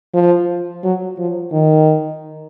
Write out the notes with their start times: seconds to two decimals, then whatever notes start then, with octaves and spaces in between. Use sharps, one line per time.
0.14 F3
0.84 F#3
1.18 F3
1.52 D#3